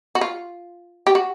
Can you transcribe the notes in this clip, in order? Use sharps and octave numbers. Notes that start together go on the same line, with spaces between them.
F#4
F4
G4
F#4